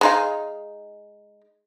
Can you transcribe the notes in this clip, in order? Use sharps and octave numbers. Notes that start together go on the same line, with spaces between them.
G#3 D#4 F5